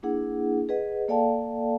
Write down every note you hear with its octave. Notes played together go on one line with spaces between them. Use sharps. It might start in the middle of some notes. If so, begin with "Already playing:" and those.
A#3 D4 E4 G#4 F#5
G#4 B4 D#5 F#5
A#3 A4 D5 F5 G5 A5